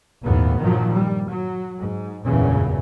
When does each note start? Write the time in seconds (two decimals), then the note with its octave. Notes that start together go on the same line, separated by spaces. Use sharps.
0.23 G1 D#2 A2 B3
0.60 G2 A#2 D#3 F3 F#3
0.92 G3
1.28 F#3
1.80 G#2
2.25 F#1 E2 G2 A#2 C#3 E3